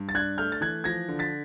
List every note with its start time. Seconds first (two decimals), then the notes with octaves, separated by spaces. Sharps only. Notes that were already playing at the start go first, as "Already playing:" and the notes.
Already playing: G2
0.09 A6
0.14 D4 F#6 G#6
0.38 A3 F6 G6
0.52 A6
0.61 E3 F#6 G#6
0.84 F3 G#6 A#6
1.08 D3
1.19 A6 B6